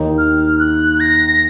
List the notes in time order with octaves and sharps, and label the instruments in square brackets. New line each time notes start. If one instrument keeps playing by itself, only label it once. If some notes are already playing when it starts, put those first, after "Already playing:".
Already playing: [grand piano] D#2 D#3 A#3 D#4
[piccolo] F6
F#6
A#6